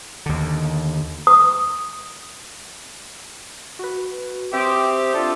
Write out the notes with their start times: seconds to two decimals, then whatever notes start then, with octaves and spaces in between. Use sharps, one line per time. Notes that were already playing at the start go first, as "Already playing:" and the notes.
0.26 D#2 D3
1.27 D#6
3.79 F#4 B4
4.53 C4 G4 E5 D6 D#6
5.14 D4 F4 A4